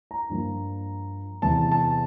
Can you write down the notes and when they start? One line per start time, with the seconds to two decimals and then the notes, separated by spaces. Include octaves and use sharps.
0.11 A#5
0.29 G2 F3 A#3
1.42 E2 C3 E3 A5
1.72 A5